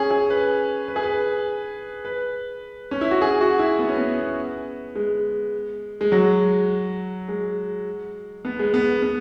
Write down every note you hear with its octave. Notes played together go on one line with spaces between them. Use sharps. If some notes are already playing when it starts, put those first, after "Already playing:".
Already playing: C#4 G#4
G#4
B4
B4
G#4
B4
B4
C#4
E4
F#4
G#4
F#4
E4
B3
C#4
B3
G#3
G#3
F#3
G#3
B3
G#3
B3
B3